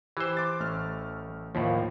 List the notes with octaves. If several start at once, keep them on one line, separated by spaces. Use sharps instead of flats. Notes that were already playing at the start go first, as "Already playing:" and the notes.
E3 G4 C5 E6
C6 D6 A6
A1 A3 F6
D#2 A2 D#3 F3 A#3